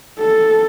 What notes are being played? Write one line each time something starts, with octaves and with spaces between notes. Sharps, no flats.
A4